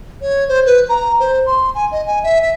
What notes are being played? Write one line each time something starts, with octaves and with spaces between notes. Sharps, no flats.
C#5
C5
B4
A#5
C5
C6
G#5
D#5
G#5
E5
E5